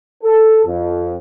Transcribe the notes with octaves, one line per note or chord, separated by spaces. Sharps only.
A4
F2